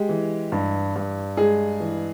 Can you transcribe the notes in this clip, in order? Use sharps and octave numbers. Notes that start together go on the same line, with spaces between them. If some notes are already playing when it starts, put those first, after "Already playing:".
Already playing: G#3 G4
E3
G2
G2
G#3 G#4
E3